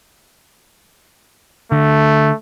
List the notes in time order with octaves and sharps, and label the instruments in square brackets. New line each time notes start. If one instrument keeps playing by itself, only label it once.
[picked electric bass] D3 [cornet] A3